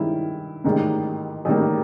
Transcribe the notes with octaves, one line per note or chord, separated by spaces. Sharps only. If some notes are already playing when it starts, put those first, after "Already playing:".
Already playing: G2 D#3 G#3 C#4 E4
A1 G#2 D#3 G3 A#3
A1 G#2 D#3 G3 A#3